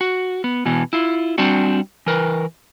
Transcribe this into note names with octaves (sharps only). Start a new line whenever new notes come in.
F#4
B3
B2 E3 B3
E4 F4
G3 C4 D4 F#4
E3 A#4 B4